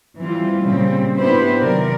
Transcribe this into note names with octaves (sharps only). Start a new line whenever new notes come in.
E3 G3 C4 F4
A#2 C#3 G3 C4
B3 D4 E4 G4 B4 C5
C3 D#3 F#3 A#4 D5